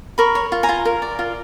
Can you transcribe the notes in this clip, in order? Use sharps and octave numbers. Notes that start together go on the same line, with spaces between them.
A#4 B5 C#6
C#5
F4
G#5 A#5
F4
A#4
D5
F4